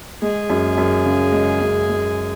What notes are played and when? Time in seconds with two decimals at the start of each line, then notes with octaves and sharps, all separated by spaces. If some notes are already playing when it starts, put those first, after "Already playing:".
0.22 G#3 G#4
0.50 F#2
0.78 F#2
1.05 C#3
1.32 G#3
1.61 F#2
1.89 G#3